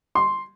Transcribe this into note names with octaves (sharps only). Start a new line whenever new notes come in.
C6